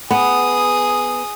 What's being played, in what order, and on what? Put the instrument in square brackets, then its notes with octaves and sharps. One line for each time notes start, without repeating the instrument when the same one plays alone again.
[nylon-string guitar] B3 [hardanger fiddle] G#4 D#6